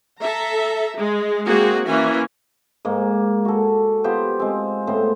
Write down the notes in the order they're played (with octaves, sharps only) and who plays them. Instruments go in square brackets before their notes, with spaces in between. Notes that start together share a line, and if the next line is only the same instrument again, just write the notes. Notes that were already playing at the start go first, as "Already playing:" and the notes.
[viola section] A4 E5 A#5
G#3
G#3 A#3 C4 F#4 G#4
E3 A#3 C#4 G#5
[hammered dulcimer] G#2 A#3
F#4 A4
B3 F4 G4 C5
G#3 C4
A2 B3 C4 C5